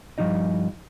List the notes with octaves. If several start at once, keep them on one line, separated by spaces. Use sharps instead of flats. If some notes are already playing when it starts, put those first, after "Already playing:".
G2 D#3 F3 G3 D#4 D#5